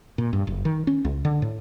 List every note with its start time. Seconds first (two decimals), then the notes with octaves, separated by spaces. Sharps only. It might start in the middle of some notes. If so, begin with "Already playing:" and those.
0.18 A#2
0.33 G2
0.47 F#1
0.65 D#3
0.87 C#4
1.05 C#2
1.25 D3
1.42 A2